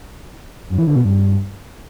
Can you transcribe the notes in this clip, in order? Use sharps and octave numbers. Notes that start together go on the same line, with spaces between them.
F#2
E3
D3
B2
G2